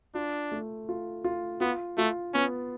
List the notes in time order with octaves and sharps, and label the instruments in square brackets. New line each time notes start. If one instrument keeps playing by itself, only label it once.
[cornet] D4 [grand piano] F4
[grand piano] A3
F4
F4
[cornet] B3 [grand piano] F4
[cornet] A3 [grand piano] F4
[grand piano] B3 [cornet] C#4